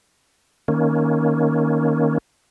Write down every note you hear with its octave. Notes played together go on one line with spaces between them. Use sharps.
D#3 A#3 C#4